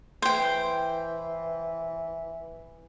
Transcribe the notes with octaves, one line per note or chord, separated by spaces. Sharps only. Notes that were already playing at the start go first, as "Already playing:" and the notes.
E3 C5 G5